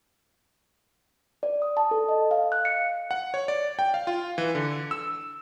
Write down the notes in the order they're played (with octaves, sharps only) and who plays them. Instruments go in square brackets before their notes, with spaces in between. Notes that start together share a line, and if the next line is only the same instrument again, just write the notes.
[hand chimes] D5
D#6
A5
A4
D#5
F5
F#6
C#7
[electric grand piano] F#5
C#5
D5
G5
F5
F4
E3
D3
E6